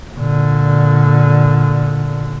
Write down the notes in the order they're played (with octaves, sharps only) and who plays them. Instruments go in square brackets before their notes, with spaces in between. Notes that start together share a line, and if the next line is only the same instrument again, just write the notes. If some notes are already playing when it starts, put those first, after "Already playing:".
[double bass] A#2 D3